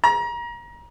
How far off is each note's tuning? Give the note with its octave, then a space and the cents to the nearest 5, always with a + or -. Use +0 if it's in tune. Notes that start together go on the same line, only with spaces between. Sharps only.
A#5 +30